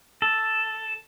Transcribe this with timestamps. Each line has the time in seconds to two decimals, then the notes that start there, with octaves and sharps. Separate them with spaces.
0.22 A4